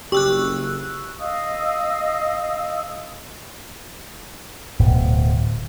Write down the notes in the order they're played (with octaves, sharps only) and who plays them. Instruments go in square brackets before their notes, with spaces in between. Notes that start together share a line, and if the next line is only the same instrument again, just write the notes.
[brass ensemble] F#1 [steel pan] G4 [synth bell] C#6 E6 F#6
[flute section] D#5 F5 D#6 E6
[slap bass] D1 B2